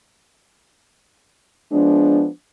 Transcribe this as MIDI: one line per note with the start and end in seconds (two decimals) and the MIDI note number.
1.72 2.28 53
1.72 2.28 56
1.72 2.28 59
1.72 2.28 62